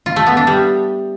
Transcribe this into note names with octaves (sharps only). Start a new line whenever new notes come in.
F4
A3
B3
D4
G3